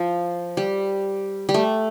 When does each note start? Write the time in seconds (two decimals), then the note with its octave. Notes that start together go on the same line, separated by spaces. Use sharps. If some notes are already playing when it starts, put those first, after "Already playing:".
Already playing: F3
0.57 G3
1.49 G3
1.54 A3